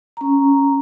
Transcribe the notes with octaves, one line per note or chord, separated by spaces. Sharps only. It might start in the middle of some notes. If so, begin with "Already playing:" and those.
C#4 A#5